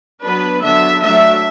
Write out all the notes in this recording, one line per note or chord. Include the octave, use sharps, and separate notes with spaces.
F#3 B3 D4 B4
D3 F#3 B3 D4 E5
F#3 A3 D4 E5